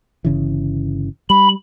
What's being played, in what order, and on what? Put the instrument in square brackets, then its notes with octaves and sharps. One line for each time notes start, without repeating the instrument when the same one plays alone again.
[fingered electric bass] G1 C#3 E3
[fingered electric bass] G3 [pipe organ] B5